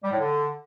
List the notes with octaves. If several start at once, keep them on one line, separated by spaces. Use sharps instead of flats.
G3
A2
D3